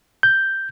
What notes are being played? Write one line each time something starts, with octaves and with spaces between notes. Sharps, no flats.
G6